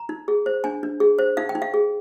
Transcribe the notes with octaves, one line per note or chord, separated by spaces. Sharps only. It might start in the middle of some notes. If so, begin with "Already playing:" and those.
Already playing: A#5
D#4
G#4
C5
D4 G#5
D4
G#4
C5
D#4 F5
G5
D#4
F5
G#4